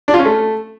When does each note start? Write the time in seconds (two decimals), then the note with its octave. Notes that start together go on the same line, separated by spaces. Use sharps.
0.08 D4
0.14 F4
0.20 C#4
0.25 A3